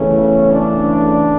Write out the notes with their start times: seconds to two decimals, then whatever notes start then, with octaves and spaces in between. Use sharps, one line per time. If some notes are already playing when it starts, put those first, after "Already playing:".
Already playing: E2 C#3 E3 A3 C#4
0.52 D4